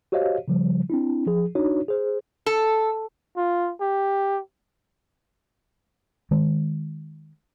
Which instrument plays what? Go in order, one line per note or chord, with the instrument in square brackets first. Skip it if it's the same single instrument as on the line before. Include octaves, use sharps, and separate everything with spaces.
[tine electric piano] F#4 G4 C5 C#5 D#5 F5
C#3 F3 G3
C4 D4 E4
F3 G#4
D4 D#4 F#4 C#5
G#4 C5
[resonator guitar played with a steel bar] A4
[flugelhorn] F4
G4
[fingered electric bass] D#3 G#3